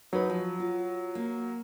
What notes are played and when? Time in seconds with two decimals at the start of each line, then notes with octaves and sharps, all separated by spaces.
0.13 F#3 D#4 G#4 B4
0.29 F3
0.60 F4
1.15 A#3